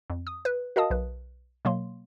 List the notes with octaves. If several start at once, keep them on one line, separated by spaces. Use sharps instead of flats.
F2
D#6
B4
F#4 A#4 D#5 F5 A5 D#6
B1 B4
B2 F#3 A#3 C6